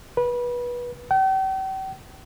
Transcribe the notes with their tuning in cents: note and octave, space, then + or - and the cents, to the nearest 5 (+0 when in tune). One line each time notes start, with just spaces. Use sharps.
B4 -25
G5 -40